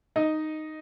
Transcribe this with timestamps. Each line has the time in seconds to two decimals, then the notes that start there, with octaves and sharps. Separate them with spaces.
0.16 D#4 D#5